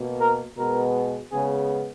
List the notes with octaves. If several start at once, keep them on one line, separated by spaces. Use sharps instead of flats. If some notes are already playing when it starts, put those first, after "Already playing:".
Already playing: B2 A#3
A#4
B2 G#3 B3 A#4
C#3 G#3 B3 G#4